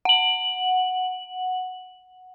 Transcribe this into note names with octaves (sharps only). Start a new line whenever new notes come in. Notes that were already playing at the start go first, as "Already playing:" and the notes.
F#5 F#7